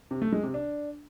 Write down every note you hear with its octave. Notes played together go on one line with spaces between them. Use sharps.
C3
A3
G#3
C3
D4